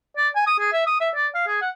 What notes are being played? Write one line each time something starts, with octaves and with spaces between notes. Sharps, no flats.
D5
G#5
D#6
G#4
E5
D#6
E5
D5
F5
G#4
F#5